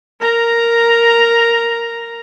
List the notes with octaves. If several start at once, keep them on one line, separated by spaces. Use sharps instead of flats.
A#4 A#5